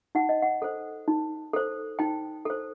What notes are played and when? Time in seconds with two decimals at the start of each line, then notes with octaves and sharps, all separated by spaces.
0.15 D#4 F#5
0.29 D#5
0.42 F#5
0.62 A4 C5
1.08 D#4
1.53 A4 C5
1.99 D#4 G5
2.45 A4 C5